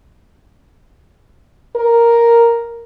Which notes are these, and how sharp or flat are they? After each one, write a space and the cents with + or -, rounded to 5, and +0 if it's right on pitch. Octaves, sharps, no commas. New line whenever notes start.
A#4 +0